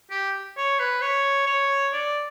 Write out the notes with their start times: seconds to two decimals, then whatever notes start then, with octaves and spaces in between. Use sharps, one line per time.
0.11 G4
0.57 C#5
0.80 B4
1.02 C#5
1.47 C#5
1.93 D5